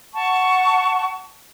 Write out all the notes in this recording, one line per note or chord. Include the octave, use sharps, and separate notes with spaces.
F#5 A5 C#6